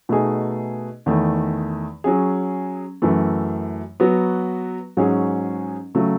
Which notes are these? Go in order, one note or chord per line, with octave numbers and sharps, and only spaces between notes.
B2 A3 D#4 G#4
E2 D#3 A3
F#3 C#4 G#4
F#2 E3 A3
F#3 B3 F#4
G#2 F#3 C#4 G#4
C#3 F#3 A3